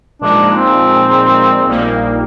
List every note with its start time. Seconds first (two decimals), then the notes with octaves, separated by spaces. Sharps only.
0.21 A#2 F3 G#3 D4 D#4
0.57 C4
1.67 A#1 A#2 G3 A#3 D#4